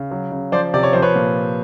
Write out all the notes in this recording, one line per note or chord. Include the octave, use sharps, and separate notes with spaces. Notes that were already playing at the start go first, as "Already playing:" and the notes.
Already playing: C#3
F#3
C#3
F3 C5 D5
C3 D5
C#5
F3 C5
B4 C#5
A#2